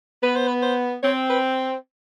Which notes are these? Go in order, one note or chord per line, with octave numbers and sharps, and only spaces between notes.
B3 B4
C5
B4
C5
C4 C#5
B4